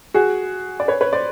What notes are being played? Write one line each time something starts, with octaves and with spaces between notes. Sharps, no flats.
F#4 G#4
D5
B4 C#5
B4 C#5
C5 D5